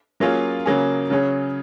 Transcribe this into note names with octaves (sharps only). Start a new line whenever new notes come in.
F#3 A#3 C#4 F4 G#4
C#3 F#3 A#3 C#4 G#4
C#3 F#3 C#4 G#4